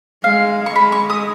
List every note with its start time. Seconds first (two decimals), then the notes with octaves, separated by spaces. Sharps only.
0.24 G#3 F5
0.66 C#6
0.75 G#3 B5
0.92 C#6
1.10 D#6